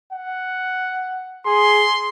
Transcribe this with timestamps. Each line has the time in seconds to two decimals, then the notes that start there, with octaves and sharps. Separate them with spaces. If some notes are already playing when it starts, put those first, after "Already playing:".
0.12 F#5
1.46 G#4 C6